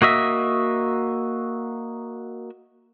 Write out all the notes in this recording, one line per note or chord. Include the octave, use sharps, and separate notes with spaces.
A#3 F#4 D#5 E5